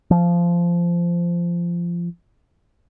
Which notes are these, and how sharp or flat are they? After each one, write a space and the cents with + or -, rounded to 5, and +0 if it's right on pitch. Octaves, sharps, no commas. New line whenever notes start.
F3 -15